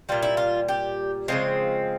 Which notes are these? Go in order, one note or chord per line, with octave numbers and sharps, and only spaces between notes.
A#2 G3 F4
E4
F4
G4
C#3 F3 G#3 C4